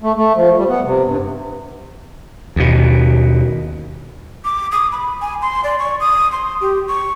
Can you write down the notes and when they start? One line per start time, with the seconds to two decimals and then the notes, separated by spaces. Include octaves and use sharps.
0.02 A3
0.16 A3
0.35 F3
0.56 G3
0.69 B3
0.84 C3
1.05 G2
2.56 D#2 B2
4.45 D6
4.72 D#6
4.92 B5
5.22 G#5
5.42 C6
5.64 D5
5.79 C#6
6.00 D#6
6.32 C6
6.61 G4
6.88 C#6